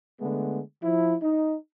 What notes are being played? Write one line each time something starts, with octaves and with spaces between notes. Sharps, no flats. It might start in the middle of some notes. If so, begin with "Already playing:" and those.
D3 G#3 A3 B3
F3 E4
D#4